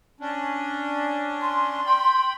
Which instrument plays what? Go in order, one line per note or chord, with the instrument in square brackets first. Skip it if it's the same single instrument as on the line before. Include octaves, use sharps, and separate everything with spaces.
[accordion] C#4 D4
[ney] C6
[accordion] G5 B5